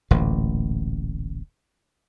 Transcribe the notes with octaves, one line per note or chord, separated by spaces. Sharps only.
D1 A1 A#2